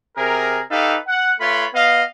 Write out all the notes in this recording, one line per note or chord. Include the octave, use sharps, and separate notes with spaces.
C3 G#4 A#4
D#4 G4 A4 B4 F5
F#5
A3 F4 B4 C#5 B5
B3 D#5 F5